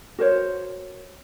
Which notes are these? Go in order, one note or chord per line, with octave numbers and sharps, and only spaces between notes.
F#4 A#4 C5 C#5